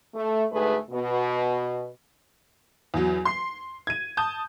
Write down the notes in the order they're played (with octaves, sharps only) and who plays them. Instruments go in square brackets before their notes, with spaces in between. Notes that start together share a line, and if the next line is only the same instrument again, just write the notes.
[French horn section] A3
D2 G#2 A3 G#4 B4
B2
[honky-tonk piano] E2 F#3
C6 C7
G#6 D#7
A5 D#6 G6